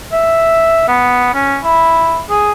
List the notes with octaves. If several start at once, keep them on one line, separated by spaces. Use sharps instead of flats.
E5
B3
C#4
E4
G#4